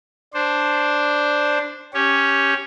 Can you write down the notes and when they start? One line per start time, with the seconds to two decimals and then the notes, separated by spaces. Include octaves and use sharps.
0.34 D4 C5
1.94 C#4 G4 C#5